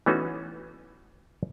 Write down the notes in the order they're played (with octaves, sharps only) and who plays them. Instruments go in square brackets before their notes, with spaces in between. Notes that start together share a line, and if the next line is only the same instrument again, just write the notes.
[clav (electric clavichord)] E3 A3 B3 C#4 D#4 F#4